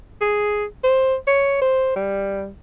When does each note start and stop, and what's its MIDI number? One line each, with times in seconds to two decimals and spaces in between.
0.21 0.65 68
0.83 1.15 72
1.27 1.61 73
1.61 1.92 72
1.96 2.48 55